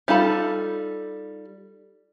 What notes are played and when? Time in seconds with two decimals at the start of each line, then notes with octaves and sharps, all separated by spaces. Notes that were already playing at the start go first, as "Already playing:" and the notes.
0.08 G3 D#4 F4 A4 B5